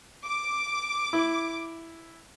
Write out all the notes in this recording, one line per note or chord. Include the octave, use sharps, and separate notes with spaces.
D6
E4